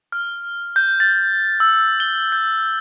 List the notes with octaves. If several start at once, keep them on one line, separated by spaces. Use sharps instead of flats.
F6
G6
A6
E6
G7
G6